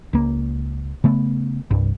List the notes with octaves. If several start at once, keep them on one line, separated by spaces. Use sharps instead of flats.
C#2 A#3
C#3 A3 B3
C2 G2